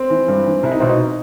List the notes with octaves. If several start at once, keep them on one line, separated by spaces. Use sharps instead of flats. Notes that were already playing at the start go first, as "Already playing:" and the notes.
Already playing: C4
E3
G2
E3
C2 E4
D#4
B2 C4
D#4